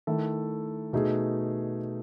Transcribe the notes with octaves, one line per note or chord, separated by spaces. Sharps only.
D#3 A3 E4 A4
B2 A3 D#4 G#4